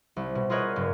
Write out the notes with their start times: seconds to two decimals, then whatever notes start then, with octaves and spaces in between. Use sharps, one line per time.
0.16 C2
0.35 B2
0.50 F4 G#4 A#4 B4 C#5 D#5
0.76 F#1 G2